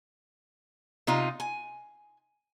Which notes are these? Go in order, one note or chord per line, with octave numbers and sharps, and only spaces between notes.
C3 D#4 F4
G#5